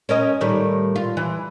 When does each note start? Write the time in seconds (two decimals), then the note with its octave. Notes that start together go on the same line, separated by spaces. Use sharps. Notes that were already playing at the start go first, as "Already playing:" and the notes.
0.09 C#4 A#4 D#5
0.41 A2 D#3 G3
0.96 F4
1.17 E3